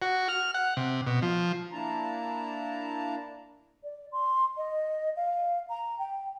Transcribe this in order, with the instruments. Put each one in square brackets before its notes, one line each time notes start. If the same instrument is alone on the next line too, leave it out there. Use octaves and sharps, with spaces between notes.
[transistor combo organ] F#4
F6
F#5
C3
B2
F3
[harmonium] A#3 D4 E4 A5 A#5
[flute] D5
C6
D#5
F5
A#5
G5